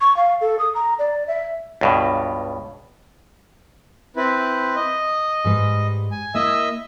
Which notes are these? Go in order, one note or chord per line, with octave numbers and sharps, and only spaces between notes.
C#6
F5
A4
D#6
A#5
D5
E5
C#2 G2 B2
C4 E4 B4
D#5
G#2 G3 B4
G#5
A#3 E4 D#5 E5 E6